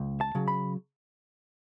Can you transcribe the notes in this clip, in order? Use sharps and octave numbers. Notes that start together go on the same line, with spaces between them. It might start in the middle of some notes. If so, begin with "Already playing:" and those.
Already playing: C#2
A5
C#3 F#3
B5